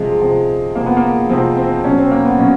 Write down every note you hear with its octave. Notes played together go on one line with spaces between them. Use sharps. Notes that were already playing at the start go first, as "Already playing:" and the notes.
Already playing: C3 F3 G#3
C3 F3
C3 F3 A#3
B3
A#3
C3 F3 C4
C4
B2 F#3 C#4
C4
A#3
B3
B2 F#3 C#4